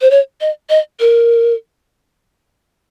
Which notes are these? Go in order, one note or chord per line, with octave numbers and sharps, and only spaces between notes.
C5
C#5
D#5
D#5
A#4